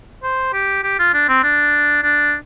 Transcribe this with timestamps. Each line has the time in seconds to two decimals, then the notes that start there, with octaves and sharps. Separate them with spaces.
0.23 C5
0.53 G4
0.83 G4
0.99 F4
1.14 D4
1.29 C4
1.43 D4
2.03 D4